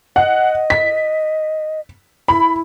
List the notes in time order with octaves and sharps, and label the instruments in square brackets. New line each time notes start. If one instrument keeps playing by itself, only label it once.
[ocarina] D#5 [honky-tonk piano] F#5
[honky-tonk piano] B6
[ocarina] E4 [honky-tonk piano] B5